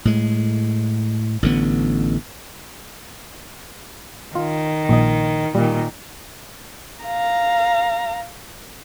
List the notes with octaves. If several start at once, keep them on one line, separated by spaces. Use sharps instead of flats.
A2 G#3
A1 D3 B3
D#3 F4
A#1 D#5
A#2 D#3 G3
F5 A#5